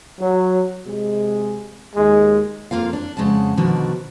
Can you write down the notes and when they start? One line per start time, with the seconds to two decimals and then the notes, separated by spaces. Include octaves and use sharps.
0.20 F#3
0.86 C3 G#3
1.96 D#2 G#3
2.71 F2 A#3 F4 F5
2.93 D4
3.17 F2 C#3 G#3 F#5 A5
3.57 B2 D3 D#3 F3 D4 F#4